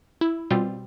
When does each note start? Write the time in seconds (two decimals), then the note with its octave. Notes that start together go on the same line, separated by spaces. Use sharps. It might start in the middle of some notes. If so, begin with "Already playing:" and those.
0.21 E4
0.51 B2 G3 C4 F4